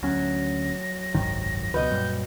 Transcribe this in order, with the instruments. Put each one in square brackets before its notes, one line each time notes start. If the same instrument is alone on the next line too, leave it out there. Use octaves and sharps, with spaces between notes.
[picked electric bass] D2 C#4 [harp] F#3 [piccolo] A#6
[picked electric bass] F#1 C2 G#2 [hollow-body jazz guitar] D#3
[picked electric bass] C#2 B2 [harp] F#4 D#5 [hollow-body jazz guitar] B4 [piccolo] G6
[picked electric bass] F#2 A#2 G3